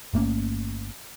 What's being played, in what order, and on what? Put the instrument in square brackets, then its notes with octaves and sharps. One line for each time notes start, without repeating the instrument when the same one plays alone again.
[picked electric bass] G1 A3 A#3 C#4